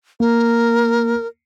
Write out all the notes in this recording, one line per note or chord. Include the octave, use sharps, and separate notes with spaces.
A#3 A#4